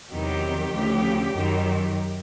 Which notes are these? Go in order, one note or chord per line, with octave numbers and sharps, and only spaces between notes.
E2 C3 D#3 F#3 G4
D2 C#3 F3
F#2 D#3 F#3